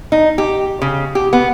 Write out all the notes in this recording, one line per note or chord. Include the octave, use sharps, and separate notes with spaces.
D#4
G4
C#3
G4
B3